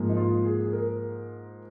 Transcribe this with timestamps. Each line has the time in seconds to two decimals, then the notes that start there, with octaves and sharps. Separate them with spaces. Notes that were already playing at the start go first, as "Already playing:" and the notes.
Already playing: G#2 F3 A#3
0.09 D#4
0.17 F4
0.45 G#4
0.64 G#4
0.73 A#4